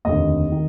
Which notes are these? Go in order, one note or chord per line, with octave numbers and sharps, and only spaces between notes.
F1 D#2 D3 D#5
D#3